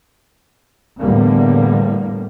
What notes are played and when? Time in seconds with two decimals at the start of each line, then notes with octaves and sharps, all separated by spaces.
1.00 E2 A2 D3 G3 A#3